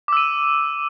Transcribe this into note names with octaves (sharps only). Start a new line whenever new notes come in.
D6 E6 D#7